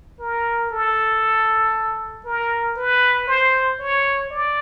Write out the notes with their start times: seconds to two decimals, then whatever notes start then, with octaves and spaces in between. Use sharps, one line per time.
0.20 A#4
0.71 A4
2.25 A#4
2.76 B4
3.28 C5
3.79 C#5
4.30 D5